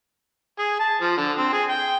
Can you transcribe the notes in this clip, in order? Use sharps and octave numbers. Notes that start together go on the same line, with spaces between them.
G#4
A5
F3
D3
C4
G#4
G5